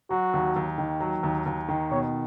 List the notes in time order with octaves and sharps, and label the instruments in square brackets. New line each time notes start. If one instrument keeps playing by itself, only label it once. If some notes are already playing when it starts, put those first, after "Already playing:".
[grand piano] F#3 [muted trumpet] F#4
[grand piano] D#2
D#2
D#3
F#3
D#2
D#2
D#3
[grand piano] B2 [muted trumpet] C#5